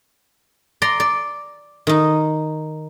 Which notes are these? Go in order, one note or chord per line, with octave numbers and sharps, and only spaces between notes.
D5 A#5 C6
D5
D#3 D#4